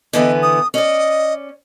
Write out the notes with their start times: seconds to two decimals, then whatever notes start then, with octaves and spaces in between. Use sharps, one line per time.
0.13 D3 E3 B3 D#5
0.42 D#6
0.74 C#4 D5 D#5